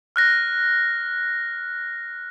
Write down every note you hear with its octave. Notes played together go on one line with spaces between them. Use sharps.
F6 F#6 A#6